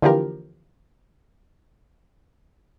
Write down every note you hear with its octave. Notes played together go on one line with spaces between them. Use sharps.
D3 E3 F3 A#3 G4 A#4